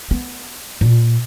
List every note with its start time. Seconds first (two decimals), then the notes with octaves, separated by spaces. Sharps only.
0.11 B3
0.81 A#2